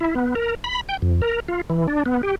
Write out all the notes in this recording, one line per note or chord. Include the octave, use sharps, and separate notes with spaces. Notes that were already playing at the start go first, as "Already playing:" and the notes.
E4
B3
A#4
B5
G5
F2
A#4
F4
E3
D4
B3
G4